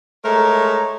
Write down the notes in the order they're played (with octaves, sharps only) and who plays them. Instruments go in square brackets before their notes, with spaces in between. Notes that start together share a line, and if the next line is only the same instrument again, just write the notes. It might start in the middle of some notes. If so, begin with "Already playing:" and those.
[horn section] G#3 A3 A#4 C#5 A#5